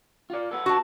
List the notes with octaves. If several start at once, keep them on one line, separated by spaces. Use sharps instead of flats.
F4 D5
B3 A4
F#4 A5